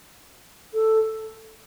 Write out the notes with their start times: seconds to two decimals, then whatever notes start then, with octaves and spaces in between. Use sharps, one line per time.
0.74 A4